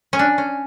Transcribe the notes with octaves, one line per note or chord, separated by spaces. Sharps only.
C#4
D4
C#4